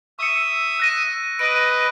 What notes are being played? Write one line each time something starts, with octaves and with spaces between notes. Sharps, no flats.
E5 C#6 D#6 E6 C#7
F#6 A#6 D#7
B4 D#5 D7 D#7